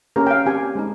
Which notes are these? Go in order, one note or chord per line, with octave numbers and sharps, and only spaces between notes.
A#3 C#4 G4 A#4
G5
F5
C4 G4 G#5
G#3 C4 D#4